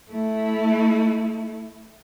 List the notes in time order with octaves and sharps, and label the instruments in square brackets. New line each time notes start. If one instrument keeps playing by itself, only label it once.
[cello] A3 E4